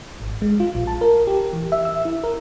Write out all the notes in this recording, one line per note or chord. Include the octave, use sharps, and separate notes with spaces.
G#1
G#3
F4
A#1
A5
A#4
G4
E3
E5
E6
E4
A#4